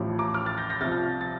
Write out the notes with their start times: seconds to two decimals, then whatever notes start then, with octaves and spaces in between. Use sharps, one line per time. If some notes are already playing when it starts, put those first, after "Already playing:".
Already playing: A1 A2 F3
0.19 A#5 D6
0.34 D6 F6
0.46 F6 A6
0.57 G6 A#6
0.70 G6 A#6
0.81 C2 C3 F3 F6 A6
1.21 A6